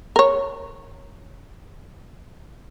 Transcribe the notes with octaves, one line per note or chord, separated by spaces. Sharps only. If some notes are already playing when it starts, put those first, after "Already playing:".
A#4 C#5